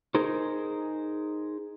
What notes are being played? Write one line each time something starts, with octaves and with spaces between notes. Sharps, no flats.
D#4 G#4 A#4 C5